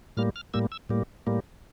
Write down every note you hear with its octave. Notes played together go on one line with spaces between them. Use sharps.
A2 G3 A#3 F6
F6
A2 G3 A#3 E6
E6
A2 G3 A#3
A2 G3 A#3